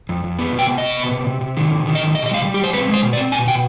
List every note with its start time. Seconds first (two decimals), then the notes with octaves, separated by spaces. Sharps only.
0.09 F2
0.24 F2
0.39 B3
0.53 C3
0.59 G5
0.67 B3
0.78 D#5
0.83 C3
0.97 B3
1.11 C3
1.27 C3
1.41 C3
1.57 D#3
1.71 C3
1.86 D#3
1.95 D#5
2.00 C3
2.15 C3 D#5
2.26 D#5
2.29 G3 F5
2.45 G3
2.54 G4
2.60 G3 C5
2.73 C4 B4
2.88 G#3
2.94 C5
3.03 B2
3.13 D5
3.17 C4
3.32 B2 G#5
3.47 B2 G5